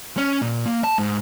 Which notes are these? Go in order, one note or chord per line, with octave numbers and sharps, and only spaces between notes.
C#4
A#2
A#3
A5
G#2